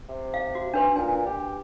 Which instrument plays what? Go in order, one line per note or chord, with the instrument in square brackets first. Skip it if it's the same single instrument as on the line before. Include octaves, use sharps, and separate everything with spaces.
[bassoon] C3
[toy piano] F5
F#4
D4 B4 C6
[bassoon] A#2 [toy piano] D4 G#5
[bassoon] G4